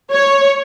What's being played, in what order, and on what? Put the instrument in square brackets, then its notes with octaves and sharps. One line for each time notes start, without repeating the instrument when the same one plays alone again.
[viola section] C#5